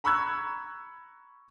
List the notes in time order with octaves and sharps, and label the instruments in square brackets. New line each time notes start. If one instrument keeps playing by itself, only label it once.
[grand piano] A#5 B5 C#6 E6 F#6 G#6